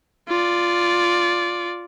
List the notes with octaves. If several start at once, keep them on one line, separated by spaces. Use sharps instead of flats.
F4 D5